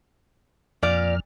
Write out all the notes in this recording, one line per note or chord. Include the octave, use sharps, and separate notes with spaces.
F2 A#2 D5 F6